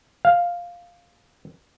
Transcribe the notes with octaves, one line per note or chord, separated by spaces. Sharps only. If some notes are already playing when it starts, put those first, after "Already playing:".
F5